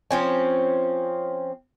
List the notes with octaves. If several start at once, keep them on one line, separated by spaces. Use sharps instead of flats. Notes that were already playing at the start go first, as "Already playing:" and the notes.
F3 C4 C#4